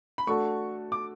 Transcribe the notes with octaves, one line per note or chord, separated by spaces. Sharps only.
B5
A3 D4 F#4 A4 C#6
D6